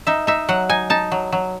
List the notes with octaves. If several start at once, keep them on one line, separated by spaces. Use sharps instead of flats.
D#4 E5
D#4 E5
F#3 F#5
D#4 G#5
D#4 A5
F#3
F#3